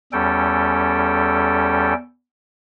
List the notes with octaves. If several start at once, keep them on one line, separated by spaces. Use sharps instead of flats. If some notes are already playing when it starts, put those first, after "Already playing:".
E2 G3 C#4 A4 G5